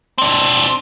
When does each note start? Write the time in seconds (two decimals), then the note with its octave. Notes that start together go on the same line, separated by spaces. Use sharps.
0.18 C4 D4